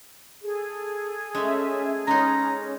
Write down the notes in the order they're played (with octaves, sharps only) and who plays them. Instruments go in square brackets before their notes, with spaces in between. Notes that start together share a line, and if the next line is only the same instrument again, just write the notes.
[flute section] G#4 A4
[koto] G#3 A3 [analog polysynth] C#4 E5
[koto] G#3 B3 D#4 [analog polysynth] C#4 [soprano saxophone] A#5